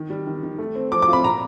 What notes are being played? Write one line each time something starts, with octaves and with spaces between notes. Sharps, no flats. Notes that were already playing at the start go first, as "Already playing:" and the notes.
Already playing: D#3
G3
D#3
D#3
A3
C4
F3 D6
D6
F4
B5
A#2 A#5